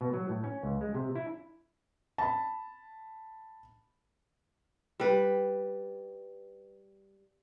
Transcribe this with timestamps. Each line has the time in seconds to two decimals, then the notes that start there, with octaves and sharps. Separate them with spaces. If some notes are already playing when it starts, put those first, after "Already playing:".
0.01 B2
0.13 F#3
0.29 A2
0.44 C#4
0.63 C#2
0.81 G#3
0.94 C3
1.15 E4
2.18 A5 B5
5.00 G3 B4